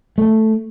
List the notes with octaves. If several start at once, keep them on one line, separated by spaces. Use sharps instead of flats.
A3